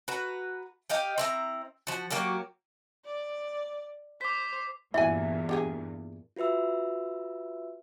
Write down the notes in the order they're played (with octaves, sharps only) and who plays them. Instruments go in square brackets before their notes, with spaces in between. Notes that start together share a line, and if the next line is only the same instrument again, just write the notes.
[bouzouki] F#4 B4 A#5
G4 D#5 F5 G5
C4 E4 A#5
F3 F#4
F#3 A#3 F#4 G4
[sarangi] D5
[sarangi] C5 [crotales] D6 B6
[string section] E2 G2 A#2 [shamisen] E4 F#4 G#5 [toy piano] E5
[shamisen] D4 G4 G#4
[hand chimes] F4 F#4 B4 E5 E6